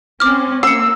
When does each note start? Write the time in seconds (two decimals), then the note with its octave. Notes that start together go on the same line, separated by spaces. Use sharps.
0.20 C4 C#4 D6 F6
0.63 A#3 E6 C7 C#7